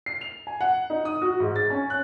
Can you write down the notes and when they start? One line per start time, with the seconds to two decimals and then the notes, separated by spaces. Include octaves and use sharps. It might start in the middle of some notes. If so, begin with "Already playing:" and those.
0.06 C7
0.21 F7
0.47 G#5
0.61 F#5
0.90 D#4
1.05 D#6
1.22 F#4
1.40 G#2
1.56 A6
1.70 C#4
1.90 F#6